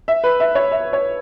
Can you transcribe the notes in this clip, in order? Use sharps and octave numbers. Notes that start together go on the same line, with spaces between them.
E5
B4
E5
C#5
E5
C#5